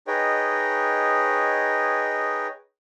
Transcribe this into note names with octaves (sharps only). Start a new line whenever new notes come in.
D#4 G#4 B4 C#5 D#5 G5